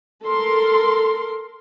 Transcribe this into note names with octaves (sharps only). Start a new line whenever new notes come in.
A4 A#4 C6